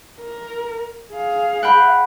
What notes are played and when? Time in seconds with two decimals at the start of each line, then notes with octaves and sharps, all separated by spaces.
0.21 A#4
1.12 G#4 F5
1.63 F#5 G5 B5